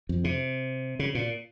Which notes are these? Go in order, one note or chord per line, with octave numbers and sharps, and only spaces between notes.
F2
C3
C#3
A#2